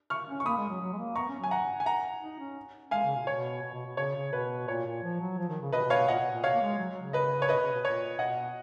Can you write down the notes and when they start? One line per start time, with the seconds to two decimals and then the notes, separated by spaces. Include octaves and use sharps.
0.10 C#6 F6
0.28 C#4
0.40 C#6
0.45 A#3 B5 D#6
0.57 G#3
0.69 F#3
0.81 F#3
0.93 G#3
0.98 A#3
1.15 B3 A#5 C#6
1.28 C#4
1.39 F#3 G#5
1.51 F#5 A#5
1.80 G#5
1.86 F#5 A#5
2.21 D#4
2.39 C#4
2.91 G#3 F5 G#5
3.04 C#3
3.15 B2
3.23 A#2
3.27 B2 C#5
3.62 B2
3.74 B2
3.85 B2
3.97 C#3 C#5
4.15 C#3
4.32 B2 B4
4.67 A#2 C#5
4.86 A#2
5.03 F3
5.21 F#3
5.38 F3
5.49 D#3
5.61 C#3
5.73 B2 B4 D#5
5.85 B2
5.90 C#5 F5
5.96 B2
6.08 A#2 D#5 F#5
6.19 B2
6.31 A#2
6.43 B2 C#5 F5
6.54 A#3
6.61 G#3
6.78 F#3
6.90 F#3
7.02 C#3
7.13 B4 D#5
7.42 C#5
7.49 B2 B4 D#5
7.60 C#3
7.72 B2
7.84 A#2 C#5
8.19 B2 D#5 F#5